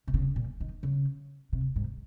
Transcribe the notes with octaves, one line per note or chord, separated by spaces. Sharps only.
C3
C#3
A#2
D#3
C#3
C3
G#2